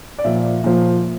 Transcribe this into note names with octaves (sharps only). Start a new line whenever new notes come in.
D5
A#2 F3 E5
A#2 F3